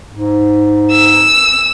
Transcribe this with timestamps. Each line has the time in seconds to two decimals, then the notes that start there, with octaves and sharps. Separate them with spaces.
0.11 G#2
0.91 E6